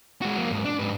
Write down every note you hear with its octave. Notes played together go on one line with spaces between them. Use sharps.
G#3 F#4
F#3 A#3
E2 G#2
D4
G#2 B4